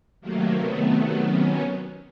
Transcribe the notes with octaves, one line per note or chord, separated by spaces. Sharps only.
C3 D#3 F#3 A3 A#3
A3 B3
B3 C#4